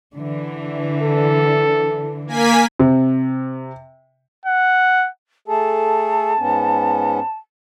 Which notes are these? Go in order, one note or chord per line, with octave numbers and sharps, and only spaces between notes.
D3 E3
A4
A#3 G#5 B6
C3
F#5
A3 G#4 A4 A5
G#2 B3 C#4